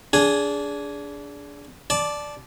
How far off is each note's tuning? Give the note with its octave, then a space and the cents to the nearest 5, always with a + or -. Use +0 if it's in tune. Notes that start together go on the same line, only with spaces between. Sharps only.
D4 -25 G#4 +0 G#5 +0
D5 +0 A5 -15